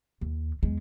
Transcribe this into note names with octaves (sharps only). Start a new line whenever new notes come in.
D#2
E2 G#3